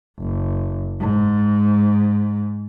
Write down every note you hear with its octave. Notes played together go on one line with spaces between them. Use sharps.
F#1
G#2